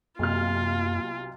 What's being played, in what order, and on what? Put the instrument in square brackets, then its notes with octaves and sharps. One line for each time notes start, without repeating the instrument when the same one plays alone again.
[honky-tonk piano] B1 C3 F6 [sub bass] F#2 [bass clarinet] A#3 [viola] F4